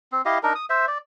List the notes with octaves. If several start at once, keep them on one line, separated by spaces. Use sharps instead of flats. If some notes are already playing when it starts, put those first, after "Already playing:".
C4
E4 G4 D#5 F5
D4 D#4 A#4
D#6
C5 E5
D5